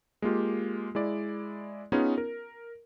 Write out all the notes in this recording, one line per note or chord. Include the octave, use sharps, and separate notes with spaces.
G#3 A#3 F4 G4
G#3 E4 D5
B3 C#4 D#4 F4 G#4 B4
A#4